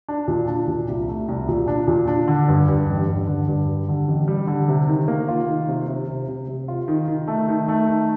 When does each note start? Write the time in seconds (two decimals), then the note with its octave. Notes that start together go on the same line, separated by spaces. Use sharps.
0.09 D4
0.28 A#2
0.48 D4
0.68 A#2
0.88 C2
1.08 A3
1.28 C2
1.48 A#2
1.68 D4
1.88 A#2
2.08 D4
2.28 D3
2.48 G2
2.68 G2
2.88 A1
3.08 G2
3.27 D3
3.48 G2
3.68 G3
3.88 D3
4.08 A1
4.28 G3
4.47 D3
4.68 C3
4.88 D#3
5.08 A#3
5.28 F4
5.48 D#3
5.68 C3
5.88 C3
6.08 C3
6.28 C3
6.48 C3
6.68 F4
6.88 D#3
7.08 D#3
7.27 A3
7.48 D#3
7.68 A3
7.88 D#3